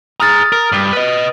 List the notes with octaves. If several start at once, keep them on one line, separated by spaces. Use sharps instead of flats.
G#4 A#5 D#6 F6 A6
A#4
G2
B4 D#5